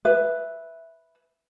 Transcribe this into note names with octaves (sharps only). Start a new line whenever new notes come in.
B4 E5